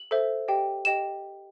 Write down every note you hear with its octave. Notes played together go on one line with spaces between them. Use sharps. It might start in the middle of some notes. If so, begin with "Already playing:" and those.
Already playing: F#7
A4 C5 E5
G4 D#5 G5
G4 D#5 G5 E7